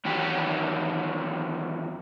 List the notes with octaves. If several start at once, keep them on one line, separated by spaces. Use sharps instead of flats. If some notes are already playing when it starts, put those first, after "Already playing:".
E2 D#3 F#3 G4